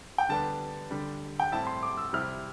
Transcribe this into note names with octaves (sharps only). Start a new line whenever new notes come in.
G5
D3 G3 B3 D4 A5
D3 G3 D4
G5
A2 G3 C4 E4 A5
C6
D6
E6
C3 G3 C4 E4 F6